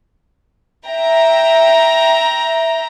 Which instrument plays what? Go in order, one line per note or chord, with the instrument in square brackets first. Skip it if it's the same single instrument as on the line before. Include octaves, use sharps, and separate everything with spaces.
[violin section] E5 G5 A#5